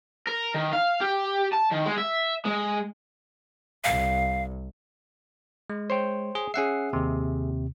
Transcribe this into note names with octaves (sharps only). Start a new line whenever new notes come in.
A#4
D#3
F5
G4
A5
D#3
G#3
E5
G#3
C2 F5
G#3
C5 C#5 G5
G#4
C#4 G#4 E5 F#5 C7
D#2 C3